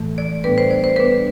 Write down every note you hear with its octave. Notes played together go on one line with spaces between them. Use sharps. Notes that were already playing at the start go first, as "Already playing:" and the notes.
Already playing: A2 E3 A3
D5
A2 G3 B3 D4 B4
C5
D5
C5
A2 G3 B3 D4 B4